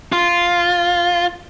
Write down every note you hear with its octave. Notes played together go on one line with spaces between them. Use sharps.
F4